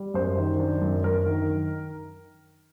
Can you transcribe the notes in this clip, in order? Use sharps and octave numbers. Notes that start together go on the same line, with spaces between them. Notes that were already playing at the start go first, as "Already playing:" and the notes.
Already playing: G3
F#2 C5
D#3
D4
F#2
F#2 A#4
D#3